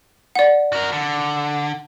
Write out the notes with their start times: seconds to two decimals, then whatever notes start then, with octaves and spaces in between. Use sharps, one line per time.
0.35 D5 F#5
0.73 F#4 A#4
0.92 D3